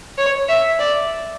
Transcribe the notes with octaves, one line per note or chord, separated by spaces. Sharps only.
C#5
E5
D5